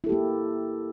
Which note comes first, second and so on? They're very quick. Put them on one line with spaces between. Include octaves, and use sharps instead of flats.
E4 A4 G4 A#3